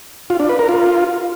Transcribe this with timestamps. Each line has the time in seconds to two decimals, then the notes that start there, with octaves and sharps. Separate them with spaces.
0.30 F4
0.40 D4
0.49 B4
0.59 A#4
0.69 F4